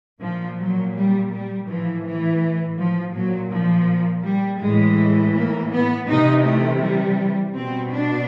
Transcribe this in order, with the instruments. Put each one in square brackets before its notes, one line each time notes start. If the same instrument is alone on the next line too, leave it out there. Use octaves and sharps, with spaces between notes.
[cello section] A#2 F3
F#3
G3
G3
A2 E3 F3
E3
F3
A#2 F#3
F3
G3
A2 E3 G#3
A#3
B3
C3 E3 D#4
A3
G3
B2 C4
D4